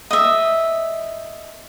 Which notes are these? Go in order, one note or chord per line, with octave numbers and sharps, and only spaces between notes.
D#5 E5